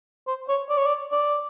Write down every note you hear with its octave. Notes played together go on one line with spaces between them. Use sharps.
C5
C#5
D5
C#5
D5
D5